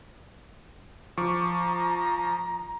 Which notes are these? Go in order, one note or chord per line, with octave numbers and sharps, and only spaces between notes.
F3 A#5 C#6 D6